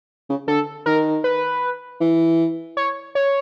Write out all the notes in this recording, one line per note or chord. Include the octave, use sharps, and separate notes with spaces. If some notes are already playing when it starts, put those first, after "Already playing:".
C#3
D3 A4
D#3 A#4
B4
E3
C#5
C#5